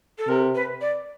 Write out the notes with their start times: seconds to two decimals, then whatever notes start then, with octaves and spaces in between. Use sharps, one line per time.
0.18 A4
0.28 C3 A#4
0.55 B4
0.81 D5